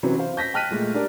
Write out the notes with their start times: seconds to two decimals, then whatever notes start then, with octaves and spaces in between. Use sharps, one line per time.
0.03 C3 E3 F#3 C#4
0.18 C5 F5
0.37 G6 A#6 B6
0.54 G5 A5 F6 F#6 B6 D#7
0.71 A#2 G#3 A3
0.94 D4 G4 A#4 D5